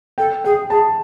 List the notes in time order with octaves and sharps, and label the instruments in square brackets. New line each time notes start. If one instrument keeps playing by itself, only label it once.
[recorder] A4 [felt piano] G5
[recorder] G#4 [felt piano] G5
[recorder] G#4 [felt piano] A5